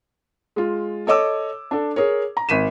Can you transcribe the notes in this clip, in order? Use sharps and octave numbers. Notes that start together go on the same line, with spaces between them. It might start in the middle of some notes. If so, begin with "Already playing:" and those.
G#3 F4
A4 C#5 D#5 D6 E6
D4 A4
G#4 A#4 C#5
A#5
G#1 B6 D#7 E7